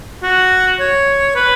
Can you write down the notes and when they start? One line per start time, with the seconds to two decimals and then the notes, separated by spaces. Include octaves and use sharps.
0.23 F#4
0.80 C#5
1.35 B4